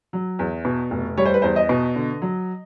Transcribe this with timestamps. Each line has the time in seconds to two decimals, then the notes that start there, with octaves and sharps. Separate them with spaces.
0.13 F#3
0.39 E2
0.65 B2
0.91 F1
1.17 G3 C#5
1.25 C5
1.34 B4
1.42 E2 C5
1.56 D#5
1.69 B2
1.96 D3
2.22 F#3